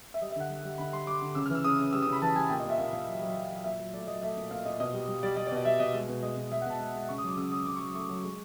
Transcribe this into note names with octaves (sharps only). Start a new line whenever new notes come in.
E5
G3 D#5
E5
D3 F#5
G3
G3
D3 B5
G3 C6
G3 D6
D3
C#3 E6
F6
E3
E6
C#3 D#6
C#3
G3 E6
D#6
C#3
B5
E3 A5
G3 G#5
A#2 G5
D#5
A#2 E5
A#2 F5
A#2 F5
F#3
F#3
F#3
F#3
A#2 E5
F#3
A3 D5
F#3 D#5
A3 E5
A#2
A#2 F5
A#2 D#5
B2 D#5
G3
G3
G3 D5
G3 D#5
D5
B2
D#5
G3 E5
B2 D#5
G#3
B2
G#3 D#5
B2
G#3 E5
F#5
B2 A5
G#3
G#3
C#3 C#6
D#6
F#3 D6
C#3 E6
F#3 D#6
C#3 D6
C#6
F#3
A3 C#6
F#3
G#3